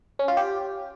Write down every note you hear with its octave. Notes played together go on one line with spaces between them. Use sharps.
C#4
F4
G4